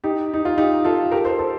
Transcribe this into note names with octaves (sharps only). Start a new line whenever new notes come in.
D#4 G4
D#4
F4
D#4 G4
F4 A4
G4 A#4
A4 C5
A4 C5